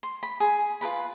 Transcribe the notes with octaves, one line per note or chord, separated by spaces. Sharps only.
C6
B5
G#4
F4 A#4 B4 B5